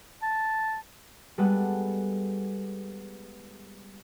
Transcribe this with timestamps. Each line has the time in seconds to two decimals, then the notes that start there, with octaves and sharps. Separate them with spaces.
0.22 A5
1.38 G3 G#3 B3 A4 B4 F#5